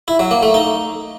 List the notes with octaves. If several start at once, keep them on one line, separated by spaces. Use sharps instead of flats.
E4
F#3
A#3
A3
D#4